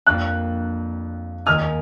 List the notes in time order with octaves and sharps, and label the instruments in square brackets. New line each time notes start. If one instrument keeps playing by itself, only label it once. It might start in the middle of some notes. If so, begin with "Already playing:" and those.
[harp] F2 F3 A#3 D4 F4 [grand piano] F#6
[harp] D#2 D#3 A#3 D#4 G#4 [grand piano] F6